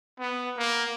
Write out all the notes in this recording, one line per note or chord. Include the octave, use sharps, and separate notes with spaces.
B3
A#3